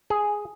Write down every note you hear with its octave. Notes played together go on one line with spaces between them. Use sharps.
G#4